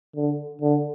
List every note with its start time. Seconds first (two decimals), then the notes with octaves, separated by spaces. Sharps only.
0.16 D3
0.62 D3